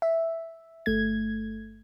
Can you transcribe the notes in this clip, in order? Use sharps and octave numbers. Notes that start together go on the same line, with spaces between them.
E5
G1 A3 G#6